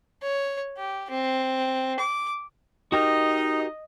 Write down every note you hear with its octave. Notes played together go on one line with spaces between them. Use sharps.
C#5
G4
C4
D6
D#4 F#4 G4 A#4 D#5